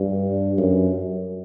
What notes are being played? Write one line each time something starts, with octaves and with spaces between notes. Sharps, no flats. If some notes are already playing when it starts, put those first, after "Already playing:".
Already playing: G2
F#2